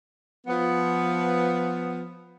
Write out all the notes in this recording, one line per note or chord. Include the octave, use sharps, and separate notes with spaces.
F3 B3